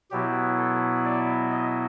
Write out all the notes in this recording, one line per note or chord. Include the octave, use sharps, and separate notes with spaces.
B2 F#3 B3 E4 G4
A4
D5
D#5